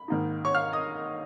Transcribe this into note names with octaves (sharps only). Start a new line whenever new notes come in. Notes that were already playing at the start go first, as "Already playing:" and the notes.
Already playing: B5
G#2 D#3 A#3 D#4
C#5 C#6
F5 F6
D#5 D#6